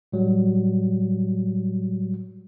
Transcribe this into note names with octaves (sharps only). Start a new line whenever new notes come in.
A2 F#3 G3